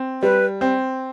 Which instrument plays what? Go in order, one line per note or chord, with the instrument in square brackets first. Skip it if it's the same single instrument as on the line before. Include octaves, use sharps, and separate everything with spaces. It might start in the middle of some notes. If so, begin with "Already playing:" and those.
Already playing: [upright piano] C4
[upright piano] G3 [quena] B4
[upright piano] C4